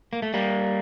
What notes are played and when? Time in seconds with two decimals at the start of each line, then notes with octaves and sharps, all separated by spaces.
0.13 A#3
0.22 A3
0.34 G3 A#3